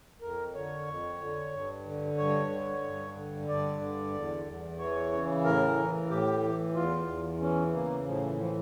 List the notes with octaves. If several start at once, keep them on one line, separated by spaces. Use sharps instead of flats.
F2 A#4
D3 C#5
F2
D3
G2
D3
G2 C#5
D3
G2
D3
G2 D5
D3
E2
E2
E3 C#5
C#3
A2 A#4
E3
A2 G4
E3
E2 F4
E2
E3 C#4
C#3 A#3
A2 F3
E3
E3 F3